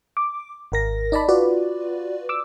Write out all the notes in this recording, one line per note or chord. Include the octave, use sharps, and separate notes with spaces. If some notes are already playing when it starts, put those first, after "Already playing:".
D6
G#1 A#4 A#6
D#4 D5 A5 B5
F4 F#4 B4 D5
D6 E6